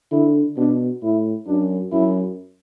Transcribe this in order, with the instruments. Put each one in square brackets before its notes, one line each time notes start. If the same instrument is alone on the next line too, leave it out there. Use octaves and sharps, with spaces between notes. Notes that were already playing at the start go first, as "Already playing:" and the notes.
[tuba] D3 [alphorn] E4
[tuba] B2 [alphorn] D4
[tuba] A2 [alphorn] E4
[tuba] F#2 [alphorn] D4
[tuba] F#2 [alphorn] E4